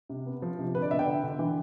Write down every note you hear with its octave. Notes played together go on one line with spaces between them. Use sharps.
C3
B3
F3
C3
D3 B4
D5
B3 E5
G5
D3
D3
E3